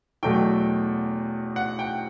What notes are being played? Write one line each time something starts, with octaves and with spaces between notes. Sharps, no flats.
E2 B2 F#3 A3 G5
F#5
G5